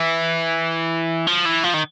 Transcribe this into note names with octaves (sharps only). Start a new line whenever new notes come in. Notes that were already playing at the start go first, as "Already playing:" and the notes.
Already playing: E3
F3
E3
F3
D#3